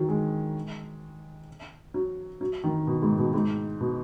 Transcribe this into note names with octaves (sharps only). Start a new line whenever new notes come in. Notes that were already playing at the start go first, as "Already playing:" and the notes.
Already playing: D#3 F#3
G#3
F#3
F#3
D#3
B2
G#2
B2
G#2
B2